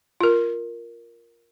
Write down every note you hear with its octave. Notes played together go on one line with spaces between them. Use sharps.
F4 A#4